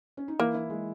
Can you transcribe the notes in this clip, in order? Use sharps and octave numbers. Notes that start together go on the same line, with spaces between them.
C#4
D#4
E3 A#3 E4
E3 E4
G#3